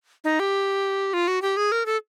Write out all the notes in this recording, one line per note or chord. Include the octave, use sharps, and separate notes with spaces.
D#4
G4
F4
F#4
G4
G#4
A#4
A4